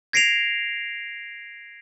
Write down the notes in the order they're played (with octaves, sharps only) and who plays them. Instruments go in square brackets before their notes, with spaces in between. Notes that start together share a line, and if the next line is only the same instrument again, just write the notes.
[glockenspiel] G#6 A#6 C7 D7 E7 F7